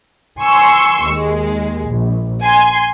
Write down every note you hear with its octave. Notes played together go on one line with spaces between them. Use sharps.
G#5 C6 C#6 E6
D#2 G#3
A#1
G#5 C6